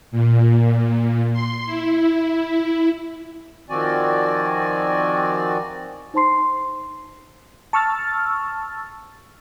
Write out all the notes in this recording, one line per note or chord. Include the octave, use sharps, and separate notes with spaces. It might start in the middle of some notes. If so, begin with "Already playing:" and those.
A#2
C6
E4
D#3 F3 C4 F#4 D5 G#5
D#4 C5 A5 C6 C7
A5 C#6 E6 F6 A6